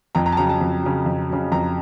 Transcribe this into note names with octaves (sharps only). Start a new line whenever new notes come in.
F2 A#5
A#5
A5
C#3 F#3 A#5
A5
F2
C#3 F#3
F2
C#3 F#3
F2 A#5